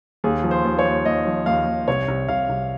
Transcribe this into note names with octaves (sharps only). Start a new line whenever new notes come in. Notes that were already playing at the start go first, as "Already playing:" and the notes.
D#2 G#4
F3
C5
D#2
C#5
D#2
D#2 D#5
F3
D#2 F5
D#2
C2 C#5
C2
C2 F5
C2